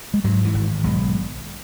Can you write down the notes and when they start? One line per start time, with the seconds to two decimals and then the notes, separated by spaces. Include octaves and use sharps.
0.14 G#3
0.24 G#2 F#3
0.45 E3
0.54 G#1
0.84 B1 G#3